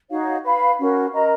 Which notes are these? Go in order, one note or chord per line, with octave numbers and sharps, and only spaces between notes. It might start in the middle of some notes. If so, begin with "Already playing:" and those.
D#4 F#4 C#5 F5
B4 F5 B5
C#4 F#4 A#4
A#4 D#5 A#5